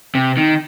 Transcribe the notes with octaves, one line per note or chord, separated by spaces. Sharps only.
C3
D#3